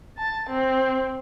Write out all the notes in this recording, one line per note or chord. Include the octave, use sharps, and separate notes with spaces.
A5
C4